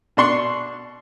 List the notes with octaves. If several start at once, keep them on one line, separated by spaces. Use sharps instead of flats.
B2 D4 C6 C#6